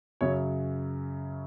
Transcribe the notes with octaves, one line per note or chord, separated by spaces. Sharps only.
F#2 C#3 F#3 C#5